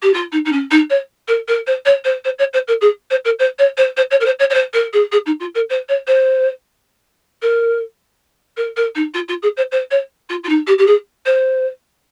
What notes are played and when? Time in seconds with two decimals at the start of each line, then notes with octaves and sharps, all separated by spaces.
0.02 G4
0.13 F4
0.32 D#4
0.45 D#4
0.52 C#4
0.71 D#4
0.90 C#5
1.28 A#4
1.48 A#4
1.67 C5
1.85 C#5
2.04 C5
2.24 C5
2.38 C#5
2.53 C5
2.67 A#4
2.81 G#4
3.10 C5
3.25 A#4
3.39 C5
3.58 C#5
3.77 C5
3.97 C5
4.10 C#5
4.20 A#4
4.25 C5
4.39 C#5
4.50 C#5
4.54 C5
4.73 A#4
4.93 G#4
5.12 G#4
5.26 D#4
5.40 F4
5.55 A#4
5.69 C5
5.88 C#5
6.07 C5
7.42 A#4
8.56 A#4
8.76 A#4
8.95 D#4
9.14 F4
9.28 F4
9.42 G#4
9.57 C5
9.71 C5
9.91 C#5
10.29 F4
10.43 F4
10.49 D#4
10.67 G4
10.78 G4
10.86 G#4
11.25 C5